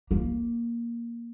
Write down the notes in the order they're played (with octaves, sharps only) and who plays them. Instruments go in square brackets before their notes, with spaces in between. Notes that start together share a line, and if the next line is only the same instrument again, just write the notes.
[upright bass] A#3